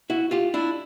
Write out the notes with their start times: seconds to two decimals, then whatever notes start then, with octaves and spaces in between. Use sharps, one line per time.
0.10 E4 F#4
0.31 F4 G4
0.54 D4 E4